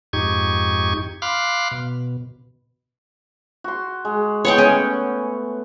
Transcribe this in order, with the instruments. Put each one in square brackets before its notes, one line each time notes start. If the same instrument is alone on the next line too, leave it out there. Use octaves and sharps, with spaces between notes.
[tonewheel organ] F2 G#2 D#4 G4 C#6 G#6
F5 B5 C6 D6 F6 F#6
B2
[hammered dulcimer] F#4 C6
G#3
[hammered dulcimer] B3 G#4 [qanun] C#5 F#5 G5
[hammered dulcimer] A3 [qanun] C#4